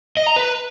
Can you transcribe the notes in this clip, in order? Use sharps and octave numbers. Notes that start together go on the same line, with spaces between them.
D#5
A#5
B4